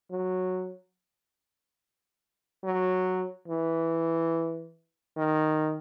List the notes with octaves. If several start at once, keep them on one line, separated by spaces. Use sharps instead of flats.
F#3
F#3
E3
D#3